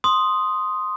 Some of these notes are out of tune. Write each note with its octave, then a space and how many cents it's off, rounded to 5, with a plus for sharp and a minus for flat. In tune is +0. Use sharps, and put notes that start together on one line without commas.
C6 +0 D#6 +0